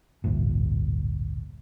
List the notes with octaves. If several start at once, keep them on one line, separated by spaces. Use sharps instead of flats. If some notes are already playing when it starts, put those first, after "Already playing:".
A1 D2 G2 A#2